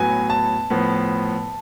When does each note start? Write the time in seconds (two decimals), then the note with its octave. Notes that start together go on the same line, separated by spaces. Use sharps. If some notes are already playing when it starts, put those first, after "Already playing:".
Already playing: A2 F#3 B3 G#5
0.30 A5
0.70 A2 F3 B3